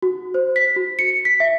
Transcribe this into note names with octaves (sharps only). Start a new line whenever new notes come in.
F#4
C5
B6
F#4
C#7
B6
E5